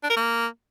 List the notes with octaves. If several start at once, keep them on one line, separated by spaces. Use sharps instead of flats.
D4
A#4
A#3